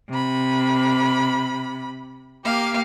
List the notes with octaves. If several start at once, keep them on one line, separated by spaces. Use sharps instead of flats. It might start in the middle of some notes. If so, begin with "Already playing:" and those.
C3 B5
A#3 G4 F5